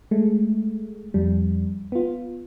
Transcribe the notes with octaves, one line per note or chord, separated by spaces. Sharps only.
G#3 A3
F2 G3
B3 F4